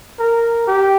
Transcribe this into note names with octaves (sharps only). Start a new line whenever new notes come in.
A#4
G4